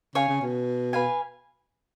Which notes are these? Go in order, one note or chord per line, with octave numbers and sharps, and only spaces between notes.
C#3 C#5 F5 G#5
C#3
B2
B4 F5 G#5